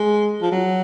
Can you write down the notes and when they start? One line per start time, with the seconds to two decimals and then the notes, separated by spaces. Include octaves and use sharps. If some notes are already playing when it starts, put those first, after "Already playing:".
Already playing: G#3
0.42 F3
0.52 F#3